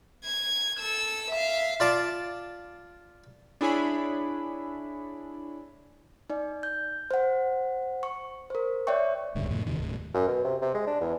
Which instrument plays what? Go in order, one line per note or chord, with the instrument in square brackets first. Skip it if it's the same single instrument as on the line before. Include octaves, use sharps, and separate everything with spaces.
[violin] G#6
A4 E6
E5 F5
[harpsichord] F4 D5 A5 D6
[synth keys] D4 E4 G#4 C#5 G#5 B5
[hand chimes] D#4 D5
G6
C5 F#5
C#6
A#4 C5
C#5 D5 E5 G5 C#6
[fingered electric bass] D1 C#2 G2 D3
F2 A2 C3
E2 C3 D#3
F1 D#2 A2
[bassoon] F#2
B2
C3
C3
G#3
D4
E2